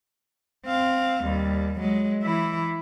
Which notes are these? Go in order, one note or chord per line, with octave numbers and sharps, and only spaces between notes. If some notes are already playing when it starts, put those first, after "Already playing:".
C4 F5
D#2 G3
F#3 G#3
E3 E4